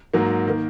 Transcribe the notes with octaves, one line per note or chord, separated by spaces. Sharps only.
G#2 F#3 A#3
D#3 A#3